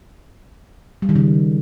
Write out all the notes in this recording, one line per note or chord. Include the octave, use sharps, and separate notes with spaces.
G3
D#3
C#3